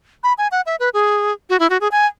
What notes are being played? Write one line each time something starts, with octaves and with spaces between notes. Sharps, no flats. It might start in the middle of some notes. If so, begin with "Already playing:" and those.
B5
G#5
F#5
E5
B4
G#4
F#4
E4
F#4
G#4
G#5